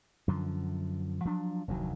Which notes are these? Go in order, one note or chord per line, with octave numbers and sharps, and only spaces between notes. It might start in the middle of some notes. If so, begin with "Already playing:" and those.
F#2 D3 F3
F3 F#3 D4
F1 D2 D#3 F#3